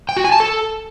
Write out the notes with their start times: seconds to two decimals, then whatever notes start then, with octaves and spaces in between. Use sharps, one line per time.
0.09 G5
0.17 F#4
0.24 G#5
0.32 A5
0.40 A4